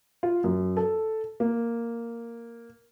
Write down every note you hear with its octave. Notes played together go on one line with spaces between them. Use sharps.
F4
F#2
A4
A#3